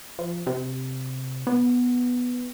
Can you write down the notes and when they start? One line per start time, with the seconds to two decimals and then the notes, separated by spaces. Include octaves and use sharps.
0.19 F3
0.47 C3
1.47 B3